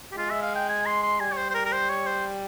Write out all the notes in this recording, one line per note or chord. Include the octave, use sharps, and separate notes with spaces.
G4
G#3 F4
E5
F5
G5
G#5
C6
C6
G3 G#5
C#5
C5
C5
A#4
A#4
C5
C#5
C5